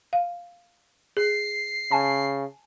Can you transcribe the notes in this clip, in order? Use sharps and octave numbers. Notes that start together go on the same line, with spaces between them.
F5
G#4 C7
C#3 G#5 A5